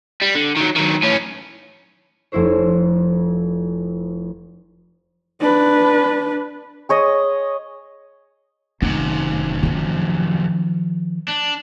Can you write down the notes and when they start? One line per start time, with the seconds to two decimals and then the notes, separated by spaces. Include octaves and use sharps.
0.22 G3
0.35 D3
0.57 D#3 F#3
0.77 D#3 F#3
1.03 A2 C#4
2.32 F1 F2 E4 C5 C#5
5.40 D4 B4
6.89 G#4 C#5 D#5
8.82 F1 F#2 C3 D#3
9.63 D#3 F3
11.28 D4